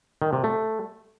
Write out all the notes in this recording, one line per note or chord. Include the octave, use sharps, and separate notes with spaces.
D#3
C3
A3